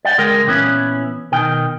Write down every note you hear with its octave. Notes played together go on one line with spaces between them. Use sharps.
D5 F#5 G5
C#2 G#3 A#4 G5
A#2 E3 B3 C#4 E4
B2 D#3 G5